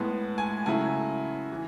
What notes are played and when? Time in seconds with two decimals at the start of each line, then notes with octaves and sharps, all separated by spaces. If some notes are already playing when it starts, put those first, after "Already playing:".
Already playing: A2 G#3 B3
0.38 G#5
0.66 C#3 F#3 A3 E4 G#5
1.52 E3